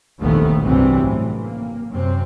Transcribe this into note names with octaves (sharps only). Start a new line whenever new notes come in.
F1 A#1 D#2 D#3 A3 B3
C2 G2 C3 E3 F#3 C4
A1
A#3
F#2 C3 C4